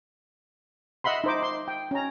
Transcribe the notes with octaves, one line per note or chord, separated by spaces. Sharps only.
D#5 E5 F#5 B5 C6
D#4 C5 D6
C6
G5
C#4 A#5